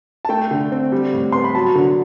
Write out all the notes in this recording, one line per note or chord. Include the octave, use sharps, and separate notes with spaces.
A5
A3 G5
D3
C4
G3
A2
B3 C6
B5
F#3 A5
D3